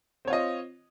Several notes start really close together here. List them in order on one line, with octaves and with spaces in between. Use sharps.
C4 C#5 F4 D#5